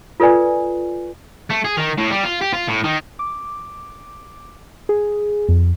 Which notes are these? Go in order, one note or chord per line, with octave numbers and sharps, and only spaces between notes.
F4 A4 B4 D5 G#5
A3
G#4
D#3
A2
G3
F4
G4
F4
A2
D#3
D6
G#4
F2